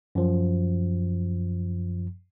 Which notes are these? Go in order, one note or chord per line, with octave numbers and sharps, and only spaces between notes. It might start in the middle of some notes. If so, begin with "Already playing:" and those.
F#2 F3